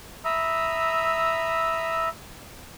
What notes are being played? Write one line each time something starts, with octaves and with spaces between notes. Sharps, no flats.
E5 A#5 B5 D#6 E6